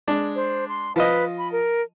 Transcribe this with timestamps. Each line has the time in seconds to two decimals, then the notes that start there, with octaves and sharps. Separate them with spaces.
0.08 G#3 D4
0.35 C5
0.69 C6
0.96 F3 F4 B4 D#5
1.38 B5
1.52 A#4